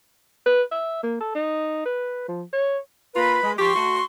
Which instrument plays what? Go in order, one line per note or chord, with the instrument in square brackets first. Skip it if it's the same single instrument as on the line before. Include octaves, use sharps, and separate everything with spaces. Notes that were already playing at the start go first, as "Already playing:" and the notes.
[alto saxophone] B4
E5
A#3
A4
D#4
B4
F3
C#5
[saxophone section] A#3 F4 [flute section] B4 B5
[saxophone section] G#3
[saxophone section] F3 G4 [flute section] C6 C#6
[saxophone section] A3 F#4